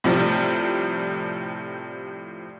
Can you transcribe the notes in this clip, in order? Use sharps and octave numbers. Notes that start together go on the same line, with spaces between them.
A2 C3 F3 G3